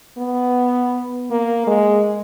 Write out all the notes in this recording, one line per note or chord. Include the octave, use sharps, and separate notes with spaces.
B3
A#3
G#3